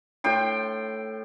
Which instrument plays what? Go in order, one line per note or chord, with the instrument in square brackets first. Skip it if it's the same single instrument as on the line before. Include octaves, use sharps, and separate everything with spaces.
[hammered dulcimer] A2 G5 C6